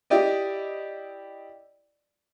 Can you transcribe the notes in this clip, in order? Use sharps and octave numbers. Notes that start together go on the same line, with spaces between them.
E4 G4 D5 D#5